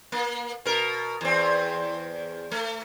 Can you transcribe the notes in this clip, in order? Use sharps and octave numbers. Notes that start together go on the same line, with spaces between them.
A#3
B2 A#4
E2 C4
A3